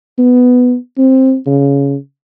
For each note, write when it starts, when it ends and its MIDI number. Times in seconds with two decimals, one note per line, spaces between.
0.19 0.75 59
0.98 1.36 60
1.47 1.95 49